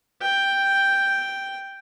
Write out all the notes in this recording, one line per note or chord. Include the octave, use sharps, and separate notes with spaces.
G5